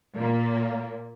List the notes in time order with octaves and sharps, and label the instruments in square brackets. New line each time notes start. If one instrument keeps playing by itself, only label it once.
[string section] A#2 A#3